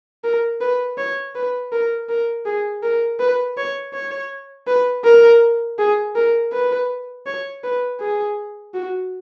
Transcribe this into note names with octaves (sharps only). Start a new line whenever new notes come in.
A#4
B4
C#5
B4
A#4
A#4
G#4
A#4
B4
C#5
C#5
B4
A#4
G#4
A#4
B4
C#5
B4
G#4
F#4